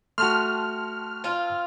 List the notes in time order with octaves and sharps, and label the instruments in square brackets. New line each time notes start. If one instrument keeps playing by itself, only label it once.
[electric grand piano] A3 F#4 [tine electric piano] G5 A5 C6 [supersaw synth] F6
[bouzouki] C4 F4